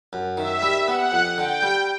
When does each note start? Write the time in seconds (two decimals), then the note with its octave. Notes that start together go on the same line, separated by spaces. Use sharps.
0.13 F#2
0.37 D#3 E5
0.62 G3
0.88 B3 F#5
1.12 F2
1.37 D3 G5
1.63 G3